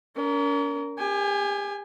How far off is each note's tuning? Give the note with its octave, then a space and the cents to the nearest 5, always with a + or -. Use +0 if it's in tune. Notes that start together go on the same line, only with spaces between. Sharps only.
C#4 +45 A#4 +0
G4 +40 G#5 +0